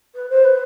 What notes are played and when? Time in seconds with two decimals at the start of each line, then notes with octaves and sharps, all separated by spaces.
0.15 B4
0.29 C5
0.44 B4